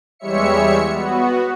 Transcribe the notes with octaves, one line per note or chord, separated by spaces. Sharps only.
E2 G3 G#3 C#5 E5 C#7
B3 F#4